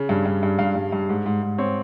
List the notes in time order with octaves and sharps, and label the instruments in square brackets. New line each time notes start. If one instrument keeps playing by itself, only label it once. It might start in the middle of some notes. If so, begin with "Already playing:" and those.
Already playing: [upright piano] C#3
G2
G2
G2
G2 F5
G2
G2
G#2
G#2
G#2
C4 C#5